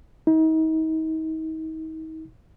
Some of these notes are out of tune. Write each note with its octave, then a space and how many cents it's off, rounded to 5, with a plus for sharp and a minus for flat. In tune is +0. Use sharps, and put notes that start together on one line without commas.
D#4 +40